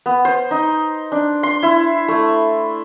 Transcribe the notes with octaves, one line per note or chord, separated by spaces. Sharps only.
B3
C5
D#4
D4
C6
E4
A3